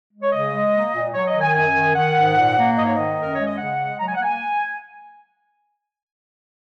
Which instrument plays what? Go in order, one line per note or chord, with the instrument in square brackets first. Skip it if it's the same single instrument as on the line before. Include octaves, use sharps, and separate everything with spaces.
[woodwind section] G#3
C#5
C#3 D#5
G#3
A#3
A#2
F#3 C#5
D#5
D#3
G#5
F#2 G#5
D#3
D#3 F#5
G#2
A#2
A#3
G#2 D#5
C#5
D#3 D#5
F#2 A#4
G#3 C#5
D#5
C#3 F#5
G#3
F#3 A#5
G#5
F#5
A#3 G#5